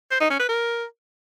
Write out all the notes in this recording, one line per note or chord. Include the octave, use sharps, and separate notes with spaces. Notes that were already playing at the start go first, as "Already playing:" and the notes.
C5
D#4
C#4
B4
A#4